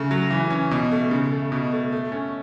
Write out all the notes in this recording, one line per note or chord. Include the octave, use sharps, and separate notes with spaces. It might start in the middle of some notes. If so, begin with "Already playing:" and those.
Already playing: C#3 A3
F#3
E3
C#4
B2
A3
C#3
A3
B2
A3
A3
C#4